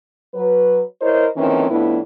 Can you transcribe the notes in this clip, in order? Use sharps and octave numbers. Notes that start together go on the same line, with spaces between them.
F#3 B4
E4 A#4 C5 C#5 D#5
F2 D#3 E3 A#3 C4 C#4
F2 A2 B3 D4 E4